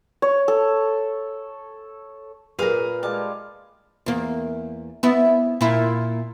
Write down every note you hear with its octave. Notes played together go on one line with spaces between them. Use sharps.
C#5
A4
A#2 G#4 A#4 B4 F5 D#6
G3 G#3 F5 A5
E2 A#3
B3 E4
A#2 E4